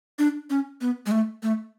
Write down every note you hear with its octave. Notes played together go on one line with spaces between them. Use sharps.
D4
C#4
B3
G#3
A3
A3